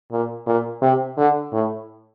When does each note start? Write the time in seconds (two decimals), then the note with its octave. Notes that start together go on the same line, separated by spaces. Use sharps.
0.12 A#2
0.47 A#2
0.82 C3
1.17 D3
1.53 A2